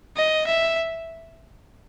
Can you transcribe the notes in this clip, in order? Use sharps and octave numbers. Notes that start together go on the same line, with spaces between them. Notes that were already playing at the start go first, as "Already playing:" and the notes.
D#5
E5